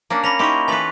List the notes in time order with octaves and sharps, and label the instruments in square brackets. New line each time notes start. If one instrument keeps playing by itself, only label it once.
[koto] A#3 C#4 D4
[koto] C#4 [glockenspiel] B5 A#6 F7
[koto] D#4 E4 G4 [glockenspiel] C6 C#6
[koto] E3 A4 B4 [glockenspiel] G#5 B6 F#7